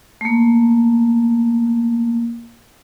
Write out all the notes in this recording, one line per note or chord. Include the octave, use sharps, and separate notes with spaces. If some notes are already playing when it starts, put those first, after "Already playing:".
A3 A#3